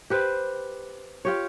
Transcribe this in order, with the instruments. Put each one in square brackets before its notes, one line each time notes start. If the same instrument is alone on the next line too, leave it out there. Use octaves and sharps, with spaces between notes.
[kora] G4 B4 C5
F4 G4 C#5